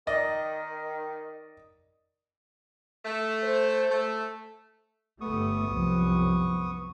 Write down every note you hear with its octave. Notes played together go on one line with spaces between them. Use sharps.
D#3 D5 D#5
A3
C5
A3
G1 A3 B3 C#6 D#6
C2 F#2 F3